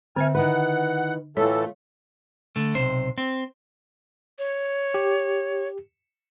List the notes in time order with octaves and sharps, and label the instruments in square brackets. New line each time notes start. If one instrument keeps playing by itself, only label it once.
[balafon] D3 E5 [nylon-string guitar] C4 [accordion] G#5 F6
[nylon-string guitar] D#3 E4 B4 [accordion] F#5
[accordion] A2 E3 A4 [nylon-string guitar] A3 F4 [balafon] C#5
[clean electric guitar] D3 A3
B1 C3 C5
C4
[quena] C#5
[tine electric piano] G4